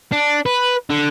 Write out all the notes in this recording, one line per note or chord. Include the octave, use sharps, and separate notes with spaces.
D4
B4
D3